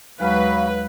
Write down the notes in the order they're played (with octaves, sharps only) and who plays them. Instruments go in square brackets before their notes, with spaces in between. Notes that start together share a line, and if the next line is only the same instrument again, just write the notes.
[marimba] D#2 G#3 F6 [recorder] F#3 [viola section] B4 [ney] F5